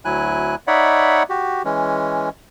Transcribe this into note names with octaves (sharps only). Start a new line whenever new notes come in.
D2 F#3 E4 G#5 F#6
D#4 C#5 D5 E5 F#5 B5
F#4 G4
E3 G#3 C#4